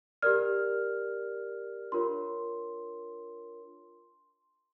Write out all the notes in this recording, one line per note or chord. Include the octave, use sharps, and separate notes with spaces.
G4 A#4 D5 F6
D4 F4 A#4 C#5 C6